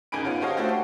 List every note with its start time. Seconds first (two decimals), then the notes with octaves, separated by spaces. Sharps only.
0.12 F#1 C#3 D#4 G#5 B5 D7
0.24 B3 C#4 F4
0.40 F#4 G4 C5 C#5 D#5 F5
0.57 A3 D4 E4 F#4 G4 C5
0.69 G5